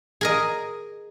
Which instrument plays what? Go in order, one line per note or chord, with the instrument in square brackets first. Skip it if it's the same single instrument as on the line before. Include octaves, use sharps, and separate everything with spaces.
[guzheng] G#4 A#4 D#5